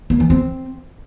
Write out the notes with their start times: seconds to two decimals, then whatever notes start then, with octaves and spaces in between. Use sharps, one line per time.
0.10 A#3
0.20 E3
0.30 C4